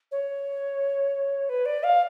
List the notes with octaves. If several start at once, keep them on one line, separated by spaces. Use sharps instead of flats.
C#5
B4
D5
F5